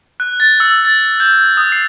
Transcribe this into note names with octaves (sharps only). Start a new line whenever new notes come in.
F#6
A6
E6
A6
G6
D#6
C7